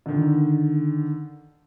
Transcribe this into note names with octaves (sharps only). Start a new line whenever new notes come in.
D3 D#3